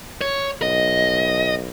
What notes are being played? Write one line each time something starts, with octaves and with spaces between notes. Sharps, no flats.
C#5
B1 D#5